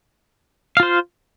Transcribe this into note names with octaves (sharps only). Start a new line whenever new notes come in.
F4 C5 F5